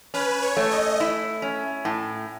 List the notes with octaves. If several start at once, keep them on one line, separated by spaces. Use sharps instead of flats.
C#4 B4
C#5
A3
D#5
E4
C#4
A2